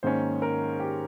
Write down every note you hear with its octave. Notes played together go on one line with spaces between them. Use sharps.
G#2 D#3 A#3 C#4 C5
A#4
G4